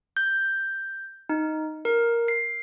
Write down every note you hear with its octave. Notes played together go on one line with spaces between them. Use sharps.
G6
D#4
A#4
C7